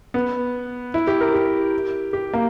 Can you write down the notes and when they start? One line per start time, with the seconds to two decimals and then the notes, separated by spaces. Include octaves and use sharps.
0.14 B3
0.94 E4
1.07 G4
1.21 A#4
1.34 G4
2.13 G4
2.34 A#3